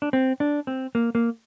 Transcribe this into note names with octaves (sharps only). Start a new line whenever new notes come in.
D4
C4
D4
C4
A#3
A#3